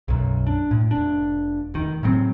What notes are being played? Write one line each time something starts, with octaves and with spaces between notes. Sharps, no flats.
B1 F#2
D4
A2
F1 D4
F1 D#3
A2 C#3 F#3 C4